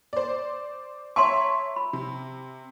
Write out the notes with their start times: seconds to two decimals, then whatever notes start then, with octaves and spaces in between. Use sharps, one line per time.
0.13 C5 D5
1.16 C#5 E5 A5 A#5 C6 C#6
1.76 B5
1.93 C3